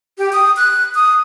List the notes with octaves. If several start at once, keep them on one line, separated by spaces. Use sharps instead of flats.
G4
D#6
F#6
D#6